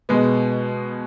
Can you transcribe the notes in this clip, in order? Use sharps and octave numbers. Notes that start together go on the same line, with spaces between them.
B2 G#3 B3